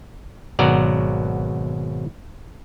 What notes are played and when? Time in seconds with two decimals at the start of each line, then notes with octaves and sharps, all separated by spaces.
0.59 G#1 B2 F#3 D5 F#5 A#5